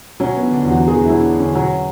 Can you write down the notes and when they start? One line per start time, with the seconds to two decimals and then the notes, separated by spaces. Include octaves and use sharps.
0.20 F#3 C#4
0.36 B3
0.42 D3
0.53 D4
0.65 E2
0.70 F#4
0.88 E2 G#4
1.05 F#3 E4
1.21 D4
1.33 D3
1.39 C#4
1.55 F#3